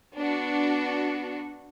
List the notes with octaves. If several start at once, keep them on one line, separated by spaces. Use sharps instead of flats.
B3 D4 F#4